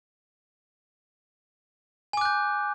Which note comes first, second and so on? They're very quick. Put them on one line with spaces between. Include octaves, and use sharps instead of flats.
G#5 D6 F#6 G6